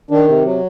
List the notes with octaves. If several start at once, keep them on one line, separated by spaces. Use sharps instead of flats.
D#3 D4
C3
F#3